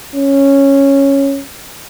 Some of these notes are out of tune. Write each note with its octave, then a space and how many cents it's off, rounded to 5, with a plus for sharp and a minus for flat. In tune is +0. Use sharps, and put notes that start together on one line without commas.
C#4 -5